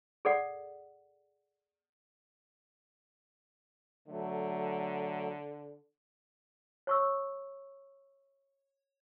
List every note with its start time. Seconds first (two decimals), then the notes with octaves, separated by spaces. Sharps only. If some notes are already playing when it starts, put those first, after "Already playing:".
0.25 G#4 A4 D5 F#5
4.08 D3 F#3 A3
6.87 C#5 C#6 E6